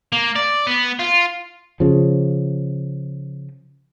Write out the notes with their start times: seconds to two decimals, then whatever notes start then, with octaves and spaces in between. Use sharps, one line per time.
0.12 A#3
0.36 D5
0.67 B3
0.99 F4
1.80 C#3 F3